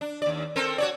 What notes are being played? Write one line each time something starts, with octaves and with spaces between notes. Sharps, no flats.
D4
D#2 D5
C4 A4 A#4
F#4 C#5 D5